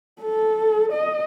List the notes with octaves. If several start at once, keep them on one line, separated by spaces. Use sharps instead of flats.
A4
D#5